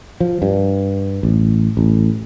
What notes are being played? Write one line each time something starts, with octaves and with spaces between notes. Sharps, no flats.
F3
G2
A1
A1